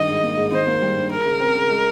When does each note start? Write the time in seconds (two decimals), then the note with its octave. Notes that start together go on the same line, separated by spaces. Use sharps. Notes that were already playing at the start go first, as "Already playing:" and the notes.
Already playing: G2 D#3 D#5
0.08 G#2
0.23 A#3
0.37 G#2
0.52 D#3 C5
0.67 A#3
0.82 G3
0.97 G2
1.11 G#3 A#4
1.25 C#3
1.40 C4
1.55 C#3
1.70 G#3